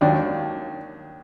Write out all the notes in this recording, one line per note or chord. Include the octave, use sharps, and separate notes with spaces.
D#2 D#3 F#3 D4